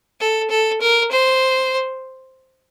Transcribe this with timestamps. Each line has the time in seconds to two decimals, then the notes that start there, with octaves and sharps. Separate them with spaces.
0.20 A4
0.50 A4
0.81 A#4
1.12 C5